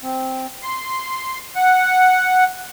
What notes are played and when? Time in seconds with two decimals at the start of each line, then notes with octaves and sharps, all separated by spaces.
0.03 C4
0.62 C6
1.56 F#5